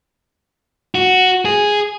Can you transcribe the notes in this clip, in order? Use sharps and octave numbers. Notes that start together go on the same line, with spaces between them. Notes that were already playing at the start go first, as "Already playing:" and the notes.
F#4
G#4